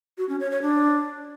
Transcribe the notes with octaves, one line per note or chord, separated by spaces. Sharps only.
F#4
C#4
C#5
C#5
D4